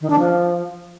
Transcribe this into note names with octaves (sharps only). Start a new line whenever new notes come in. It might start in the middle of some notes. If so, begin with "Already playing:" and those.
D#3
D4
F3